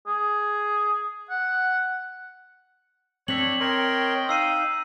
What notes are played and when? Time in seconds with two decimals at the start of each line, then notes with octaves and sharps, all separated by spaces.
0.07 G#4
1.30 F#5
3.28 C4 D4 A4 C#5 B6 F#7
3.60 A#4 C#5 D#5 G5 C6
4.29 D#4 F5 E6 C7 D#7